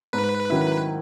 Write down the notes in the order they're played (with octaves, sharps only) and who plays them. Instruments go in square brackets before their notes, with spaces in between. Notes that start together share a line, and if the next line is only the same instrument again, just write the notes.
[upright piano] G#2 [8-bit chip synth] B4
[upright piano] D#3 F#3 C#4 E4